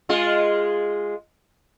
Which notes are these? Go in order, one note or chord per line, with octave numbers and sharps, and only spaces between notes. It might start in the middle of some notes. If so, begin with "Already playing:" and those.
G#3 F4